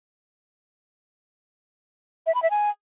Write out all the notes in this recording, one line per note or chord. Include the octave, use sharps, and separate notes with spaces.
E5
B5
E5
G#5